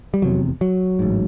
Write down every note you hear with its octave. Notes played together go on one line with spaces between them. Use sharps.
G3
F1 E2 C3 F#3
F#3
A1 G#2